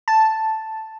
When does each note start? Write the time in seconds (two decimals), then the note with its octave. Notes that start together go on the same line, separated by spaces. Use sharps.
0.08 A5